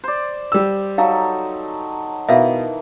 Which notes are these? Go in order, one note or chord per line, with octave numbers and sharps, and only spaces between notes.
C5 D5
G3 E6
F#3 D#4 A4 F5
B2 D#3 E3 E5 F5